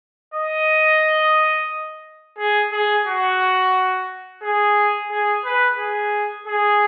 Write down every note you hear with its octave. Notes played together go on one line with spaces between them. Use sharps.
D#5
G#4
G#4
F#4
G#4
G#4
B4
G#4
G#4